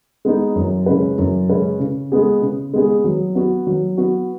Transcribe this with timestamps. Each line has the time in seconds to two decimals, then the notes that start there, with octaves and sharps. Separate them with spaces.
0.25 G#3 B3 D#4
0.56 F#2
0.86 C#3 G#3 C#4 B4
1.18 F#2
1.49 C#3 G#3 C#4 B4
1.80 C#3
2.12 G#3 B3 G#4
2.42 C#3
2.73 G#3 B3 G#4
3.04 F#3
3.35 B3 F#4
3.67 F#3
3.97 B3 F#4